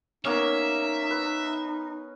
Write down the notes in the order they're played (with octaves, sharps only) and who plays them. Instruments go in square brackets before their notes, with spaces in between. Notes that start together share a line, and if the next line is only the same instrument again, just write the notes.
[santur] A#3 B3 C#4 [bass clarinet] D#4 [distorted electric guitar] E5
[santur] B4